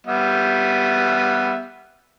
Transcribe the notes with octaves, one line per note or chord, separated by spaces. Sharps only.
G3 B3 E5